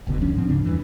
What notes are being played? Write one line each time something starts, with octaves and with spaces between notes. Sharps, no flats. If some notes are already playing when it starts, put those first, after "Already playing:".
E1 C#2 B2 D3
D2 F3 C#4 D4
G1 G#2 F3 C4
D2 C#3 D4
E2 G2 E3